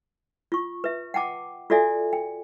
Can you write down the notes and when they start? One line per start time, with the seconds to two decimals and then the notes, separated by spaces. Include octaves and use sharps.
0.52 F4 C#6
0.84 B4 E5
1.14 F#5 G5 A5 D6
1.70 F4 F#4 A4 D5 E5 G#5
2.13 G5